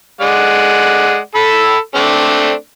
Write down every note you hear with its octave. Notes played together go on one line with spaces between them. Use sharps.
G#3 D5 F#5
A4 B5 E6
A3 C4 D4